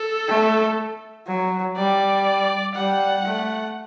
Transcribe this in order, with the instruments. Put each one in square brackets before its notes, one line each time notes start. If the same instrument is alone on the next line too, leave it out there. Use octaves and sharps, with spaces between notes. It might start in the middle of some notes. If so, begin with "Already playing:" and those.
Already playing: [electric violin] A4
[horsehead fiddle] A3
F#3
[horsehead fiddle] G3 [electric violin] D5
[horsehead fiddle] G3 [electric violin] F#5
[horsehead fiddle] A3